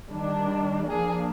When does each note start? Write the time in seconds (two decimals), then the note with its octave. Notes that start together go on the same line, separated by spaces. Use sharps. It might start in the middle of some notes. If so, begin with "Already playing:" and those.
0.11 D#3 G3 D4
0.89 F3 A#3 D4 G#4